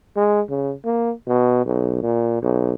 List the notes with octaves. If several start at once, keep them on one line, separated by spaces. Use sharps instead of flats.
G#3
C#3
A#3
B2
B1
A#2
B1